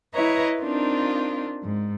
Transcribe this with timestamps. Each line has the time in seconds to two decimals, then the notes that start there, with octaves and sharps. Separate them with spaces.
0.13 E4 B4 C#5 D#5 A#5
0.60 C4 D4 D#4 F4 A#4
1.62 G#2